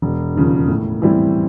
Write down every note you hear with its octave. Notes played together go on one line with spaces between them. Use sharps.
E1
D#2 C#3 F3
A2
E3 G3 C4 E4